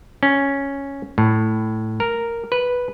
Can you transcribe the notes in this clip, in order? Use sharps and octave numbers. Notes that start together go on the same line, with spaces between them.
C#4
A2
A#4
B4